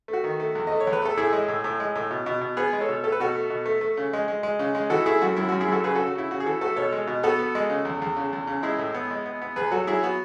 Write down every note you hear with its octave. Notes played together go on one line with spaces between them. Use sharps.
A3
F#4
D#3
A3
E2
A3 D#5
C#5
E2
B4
A3 A4
A2 E4 G#4
G#3
A2
A2
G#3
A2
B2
B2
B2
B3 G#4 B4
G#3
A4 C#5
B2
A3 A4
B4
B2 F#4 A4
A3
B2
A3
A3
C#3
G#3
G#3
G#3
C#3
G#3
E3 F#4 A4
A3 E4 G#4
F#2 F#4
F#2 E4
F#2 F#4
E4 G#4
F#2 F#4 A4
C#3 G#4 B4
C#3 F#4 A4
F#4
C#3 E4
C#3 F#4
G#4
E3 F#4 A4
A3 F#4 A4
B2 A4 C#5
G#3
B2
B3 F#4 A4
B3
G#3
C#3
E2
E2
C#3
E2
C#3
G#3 E4 G#4
A2
B3
G#3
B3
B3
E2 G#4 B4
F#3 F#4 A4
F#3 E4 G#4
B3 F#4